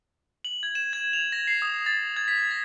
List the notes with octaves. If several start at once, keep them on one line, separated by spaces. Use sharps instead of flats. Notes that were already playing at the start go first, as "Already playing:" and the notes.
F#7
G#6
E7
G#6
F7
A#6
C7
D#6
A6
G#6
B6
A#6